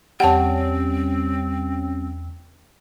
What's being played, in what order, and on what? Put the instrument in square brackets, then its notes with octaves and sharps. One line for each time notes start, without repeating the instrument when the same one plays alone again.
[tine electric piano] E2 G5 [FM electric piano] G3 C#4 [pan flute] C4 [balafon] F#5 A5